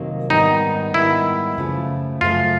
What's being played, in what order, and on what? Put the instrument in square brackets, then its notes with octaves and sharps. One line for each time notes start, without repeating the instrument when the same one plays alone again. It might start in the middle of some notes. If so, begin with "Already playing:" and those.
Already playing: [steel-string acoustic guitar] F2 C3 D#3 F#3 A#3
[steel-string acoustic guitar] G#2 D#3 G3 B3 [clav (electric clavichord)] D#4
[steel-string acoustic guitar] G#2 D#3 G3 B3 [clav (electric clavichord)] E4
[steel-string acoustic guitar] F#2 C#3 F3 A3
[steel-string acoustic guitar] F#2 C#3 F3 A3 [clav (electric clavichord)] F4